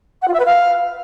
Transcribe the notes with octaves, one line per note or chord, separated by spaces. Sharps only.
F#5
F4
E5
B4
F5